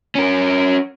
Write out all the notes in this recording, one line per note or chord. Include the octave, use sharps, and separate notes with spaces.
C#4 A#4